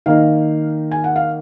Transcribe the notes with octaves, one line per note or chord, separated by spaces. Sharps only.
D#3 A#3 D#4 F5
G#5
F#5
F5